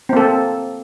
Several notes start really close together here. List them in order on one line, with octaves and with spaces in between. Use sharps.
C4 A#3 A4